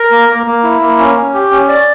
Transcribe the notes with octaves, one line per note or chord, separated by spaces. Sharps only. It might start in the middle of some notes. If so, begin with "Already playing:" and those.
Already playing: A#4
A#3
A#3
A#3
E4
A#3
C#4
C#4
G4
C#4
D5